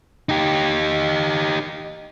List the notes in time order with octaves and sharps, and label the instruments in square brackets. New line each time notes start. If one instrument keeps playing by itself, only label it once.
[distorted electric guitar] D#4 G4